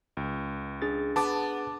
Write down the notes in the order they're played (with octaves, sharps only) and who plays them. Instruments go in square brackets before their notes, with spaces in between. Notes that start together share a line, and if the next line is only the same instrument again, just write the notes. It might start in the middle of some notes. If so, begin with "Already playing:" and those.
[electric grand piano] C#2
[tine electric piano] D4 G#4 A6
[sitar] B3 [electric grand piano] A5 D6